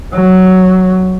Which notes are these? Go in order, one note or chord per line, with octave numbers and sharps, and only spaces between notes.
F#3